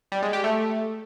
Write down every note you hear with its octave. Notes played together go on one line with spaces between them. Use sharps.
G3
G#3
G4
A3